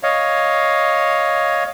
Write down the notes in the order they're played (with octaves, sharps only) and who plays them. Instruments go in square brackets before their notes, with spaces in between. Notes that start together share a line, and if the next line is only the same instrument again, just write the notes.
[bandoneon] C#5 D#5 F5